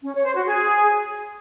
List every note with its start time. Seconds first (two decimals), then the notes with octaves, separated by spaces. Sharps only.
0.04 C#4
0.14 C#5
0.25 C5
0.35 F#4
0.46 G#4